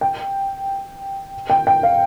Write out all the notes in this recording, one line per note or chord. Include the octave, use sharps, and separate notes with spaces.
G5
G5
G5
F5